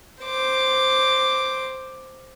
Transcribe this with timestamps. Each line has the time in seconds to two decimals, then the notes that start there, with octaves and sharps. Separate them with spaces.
0.23 C5 D6